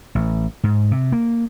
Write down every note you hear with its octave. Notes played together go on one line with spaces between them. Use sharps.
A1
G#2
C3
A#3